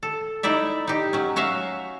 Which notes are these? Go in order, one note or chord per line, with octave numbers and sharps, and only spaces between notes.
A4
D#4 E4 D5 E5
D#4 G4
F#3 C#4
C#4 F#4 E5 F5